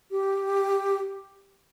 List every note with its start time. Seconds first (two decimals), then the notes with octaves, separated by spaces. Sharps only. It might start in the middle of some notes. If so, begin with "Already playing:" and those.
0.11 G4